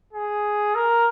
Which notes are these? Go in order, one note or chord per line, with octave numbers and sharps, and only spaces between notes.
G#4
A#4